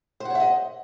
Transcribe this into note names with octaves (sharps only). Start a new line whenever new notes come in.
C5 C#5 D#5 E5 F#5